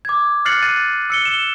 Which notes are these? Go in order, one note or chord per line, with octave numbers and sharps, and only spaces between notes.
D6 G#6
F6 F#6 A6 C7 C#7 F#7
F#6 A6 D#7
E6 C#7 G7
E7 G7